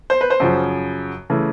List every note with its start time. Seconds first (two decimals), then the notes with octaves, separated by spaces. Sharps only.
0.10 C5
0.21 B4
0.30 C5
0.40 F#2 C#3 F3
1.30 C#3 E3 A3